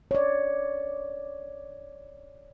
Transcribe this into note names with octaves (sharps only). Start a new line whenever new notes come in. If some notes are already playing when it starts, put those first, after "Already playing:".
C#5 D5